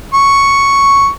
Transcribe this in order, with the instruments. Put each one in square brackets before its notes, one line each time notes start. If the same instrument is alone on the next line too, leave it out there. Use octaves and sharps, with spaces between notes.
[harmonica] C#6